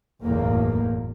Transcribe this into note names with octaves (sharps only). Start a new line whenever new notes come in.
F#1 B1 E2 A2 A#3